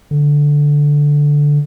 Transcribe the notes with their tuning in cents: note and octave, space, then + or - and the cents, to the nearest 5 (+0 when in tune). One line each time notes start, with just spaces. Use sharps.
D3 -5